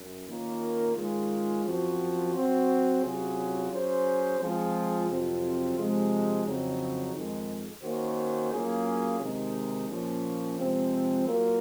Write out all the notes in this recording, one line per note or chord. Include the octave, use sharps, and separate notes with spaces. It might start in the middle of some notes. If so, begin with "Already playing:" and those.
Already playing: F#2
D#3 A#3 C#4 F4 A#4
D#3 G#3 C#4 F4
F#2 F3 C4 F#4
F#3 C4 F#4
C3 F#3 C#4 F4 G#4
F#3 C#4 G#4 C5
F3 G#3 C4 F4 G#4
F2 C3 F#3 C4 F4
C3 F3 G#3
F2 C#3 F#3 C4 D#4
F2 D#3 G#3
D#3 A#3 C#4 F#4 C5
F#3 A#3 C#4 F4 G#4
C3 D#3 G#3 D#4
A#2 F3 A#3 C#4
C3 F3 G#3 C4
F#3 A#3 F4 A#4